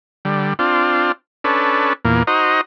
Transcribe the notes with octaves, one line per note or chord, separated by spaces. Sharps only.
D3 G3
C4 D4 F4
C#4 D4 A4 B4
E2 A#2 A#3
D#4 F#4 C5 D#5 A#5